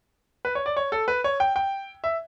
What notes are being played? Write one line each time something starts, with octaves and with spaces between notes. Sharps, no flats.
B4
C#5
D5
C#5
A4
B4
C#5
G5
G5
E5